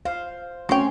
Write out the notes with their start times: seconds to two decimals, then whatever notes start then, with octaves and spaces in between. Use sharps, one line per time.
0.05 C5 F5
0.69 A3 C4 C#4 F#4 C#5 G5 C6